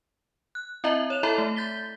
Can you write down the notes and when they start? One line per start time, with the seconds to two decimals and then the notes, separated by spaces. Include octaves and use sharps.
0.55 F#6
0.84 C4 E4 D#5 E5 A#5
1.10 C#5 E7 F7
1.23 E4 A4 E5 A#5 B5
1.38 A3
1.56 G6 A6 B6 G7